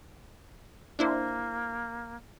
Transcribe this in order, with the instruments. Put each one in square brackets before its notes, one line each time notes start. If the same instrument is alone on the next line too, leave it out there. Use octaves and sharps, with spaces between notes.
[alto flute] A#3 [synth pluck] D4 E4 C5